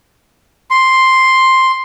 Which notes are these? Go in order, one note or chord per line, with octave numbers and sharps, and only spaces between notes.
C6